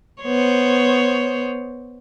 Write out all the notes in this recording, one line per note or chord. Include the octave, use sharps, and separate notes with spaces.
B3 C5 C#5